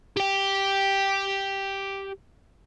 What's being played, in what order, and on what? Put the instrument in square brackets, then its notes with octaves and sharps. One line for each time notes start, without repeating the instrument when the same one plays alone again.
[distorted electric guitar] G4 G5